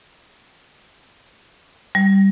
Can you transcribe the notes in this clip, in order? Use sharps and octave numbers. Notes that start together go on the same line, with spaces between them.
G3